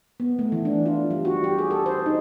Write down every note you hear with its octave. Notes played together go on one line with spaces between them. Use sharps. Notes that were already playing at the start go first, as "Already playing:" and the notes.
B3
A3
E3
D4
F4
G3
F#4
G4
G#4
A4
C5
D#4